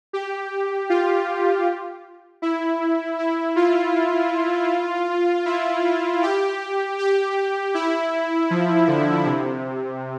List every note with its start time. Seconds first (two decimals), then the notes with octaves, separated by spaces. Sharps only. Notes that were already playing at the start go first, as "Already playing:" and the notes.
0.13 G4
0.90 F4
2.42 E4
3.18 E4
3.56 F4
5.46 E4
6.22 G4
6.98 G4
7.74 E4
8.50 F3
8.87 D3
9.26 C3